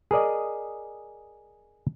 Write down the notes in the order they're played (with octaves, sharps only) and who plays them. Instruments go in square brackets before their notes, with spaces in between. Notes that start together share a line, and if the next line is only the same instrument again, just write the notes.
[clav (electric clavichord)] G#4 A#4 D5 D#5